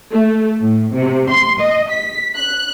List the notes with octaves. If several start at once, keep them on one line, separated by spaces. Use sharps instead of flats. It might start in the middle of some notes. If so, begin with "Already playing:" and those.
A3
A2
C3
C6
D#5
B6
F#6